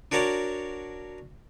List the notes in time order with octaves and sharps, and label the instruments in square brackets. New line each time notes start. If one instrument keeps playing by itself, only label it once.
[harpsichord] D4 F#4 A#4 C#5 D5